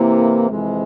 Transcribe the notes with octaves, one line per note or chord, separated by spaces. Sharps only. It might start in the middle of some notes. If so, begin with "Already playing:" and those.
Already playing: C3 E3 A#3 E4
F2 C3 E3 G#3